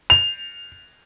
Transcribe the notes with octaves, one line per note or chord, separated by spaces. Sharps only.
F7